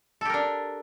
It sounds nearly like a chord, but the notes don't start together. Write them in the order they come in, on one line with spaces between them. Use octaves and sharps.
A4 G4 A#4 D4